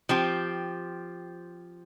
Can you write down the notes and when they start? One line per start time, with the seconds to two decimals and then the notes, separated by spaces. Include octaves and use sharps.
0.09 F3 C4 G4